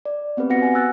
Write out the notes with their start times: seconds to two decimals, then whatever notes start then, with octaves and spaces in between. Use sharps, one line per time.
0.05 D5
0.37 B3 C4 G4 B4
0.50 B3 F#4 F#5 A#6 C#7
0.62 F#5 G#5
0.75 E6 F#6 A6